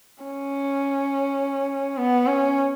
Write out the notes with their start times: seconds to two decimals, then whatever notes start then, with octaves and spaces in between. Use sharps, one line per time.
0.23 C#4
1.97 B3
2.27 C#4